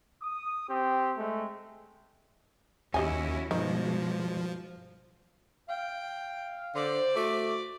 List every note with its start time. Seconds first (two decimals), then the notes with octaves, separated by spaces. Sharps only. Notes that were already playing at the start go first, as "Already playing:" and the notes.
0.21 D#6
0.68 C4 G4
1.17 G#3 A3
2.94 D#2 C#4 E4 F#4 G4 D#5 G#5
3.51 G2 B2 D#3 F3 G#3
5.69 F5 G5
6.75 D3 C5 D5
7.16 A3 F#4 D6